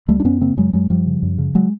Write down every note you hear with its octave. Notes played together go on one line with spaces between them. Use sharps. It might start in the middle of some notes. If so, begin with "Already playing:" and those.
C#2 G3 A3
D4
F#2 B3 C#4
C#3 A#3 C4
F#2 F#3 G#3
F#2 F#3 G#3
F#2 F3 G3
C#3
F#2
C#3
F#3 G#3